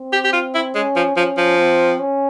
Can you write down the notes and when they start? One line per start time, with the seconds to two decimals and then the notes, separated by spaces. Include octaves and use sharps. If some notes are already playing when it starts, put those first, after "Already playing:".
Already playing: C4
0.12 G4
0.24 G4
0.33 F4
0.54 E4
0.74 G#3 C#4
0.96 F3
1.16 F3 C#4
1.37 F3
1.58 C4
2.00 C#4